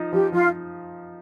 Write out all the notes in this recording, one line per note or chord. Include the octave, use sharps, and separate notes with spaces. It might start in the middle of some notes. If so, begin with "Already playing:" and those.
Already playing: F3 D#4
F3 G4
F3 F4